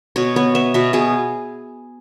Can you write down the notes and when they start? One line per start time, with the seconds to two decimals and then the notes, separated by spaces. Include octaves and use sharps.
0.16 B2 C#5
0.36 B3 C#5
0.55 B3 E5
0.74 B2 E5
0.93 B2 G#4